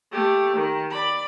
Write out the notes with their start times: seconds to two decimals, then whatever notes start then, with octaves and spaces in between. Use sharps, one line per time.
0.12 A3 G4
0.57 D#3
0.91 D5 B5